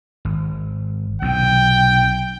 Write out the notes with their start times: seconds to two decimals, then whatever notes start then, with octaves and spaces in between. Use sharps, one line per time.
0.25 G#1
1.22 B1 C3 G5